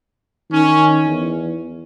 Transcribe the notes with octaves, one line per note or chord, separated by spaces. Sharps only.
D#3 C#4
E2